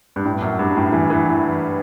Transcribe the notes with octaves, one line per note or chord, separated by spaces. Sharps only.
G2
A2
F#2
G2
A2
E3
E3